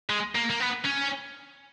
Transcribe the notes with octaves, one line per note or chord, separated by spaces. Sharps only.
G#3
A#3
A#3
B3
C#4